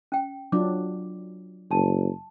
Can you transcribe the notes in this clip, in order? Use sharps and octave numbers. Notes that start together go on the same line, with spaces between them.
C#4 G5
F#3 D4 F4 D6
F#1 A5